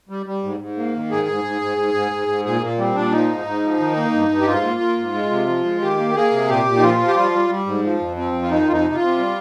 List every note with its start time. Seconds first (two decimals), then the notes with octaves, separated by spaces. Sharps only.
0.09 G3
0.26 G3
0.43 G#2
0.60 G#2
0.77 A#3
0.94 D#3
1.11 G#2 G#4
1.28 G#2
1.44 G#2
1.62 G#2
1.78 G#2
1.94 G#2
2.11 G#2
2.28 G#2
2.45 A#2 G#4
2.62 A#2 A#3
2.78 G3 C4
2.95 A#2 D4
3.12 F3 D#4
3.29 G#2
3.45 G#2
3.63 F3
3.79 D#3
3.96 A#3
4.13 G2
4.29 G2
4.41 G4
4.47 G#2 F4
4.63 A#3
4.80 A#3
4.98 G#2
5.14 G#3
5.31 C3
5.47 F3
5.64 G#3
5.81 D#3 G4
5.98 A#3
6.15 A#3 G#4
6.31 C3
6.49 A#2 G4
6.65 A#2
6.77 D#4
6.82 F3 F4
6.98 F3
7.08 G4
7.15 G3 F4
7.32 G3
7.50 G3
7.66 G#2
7.83 F3
7.99 F2
8.16 F3 C4
8.33 F2
8.42 F4
8.50 D#3 D#4
8.67 F2 F4
8.72 D#4
8.84 C3
8.94 F4
9.00 C3
9.18 G3